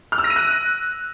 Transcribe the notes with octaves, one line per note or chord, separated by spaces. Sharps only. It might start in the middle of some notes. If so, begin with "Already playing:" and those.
F6
E6
A#6
D#7
F#6